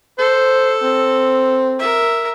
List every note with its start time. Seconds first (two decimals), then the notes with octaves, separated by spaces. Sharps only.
0.19 A4 C5
0.83 C4
1.79 A#4 E5